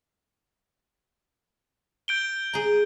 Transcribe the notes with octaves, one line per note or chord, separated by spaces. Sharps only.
G6 D7 G7
G#4 A#5